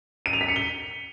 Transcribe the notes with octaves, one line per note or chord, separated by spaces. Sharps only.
D#7
F7
B6
C#7
G7